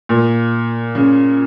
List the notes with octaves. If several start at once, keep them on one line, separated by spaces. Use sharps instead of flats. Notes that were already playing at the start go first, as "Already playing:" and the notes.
A#2
C#3